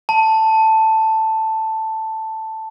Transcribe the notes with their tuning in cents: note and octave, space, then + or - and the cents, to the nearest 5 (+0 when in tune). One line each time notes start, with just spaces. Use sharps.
A5 +5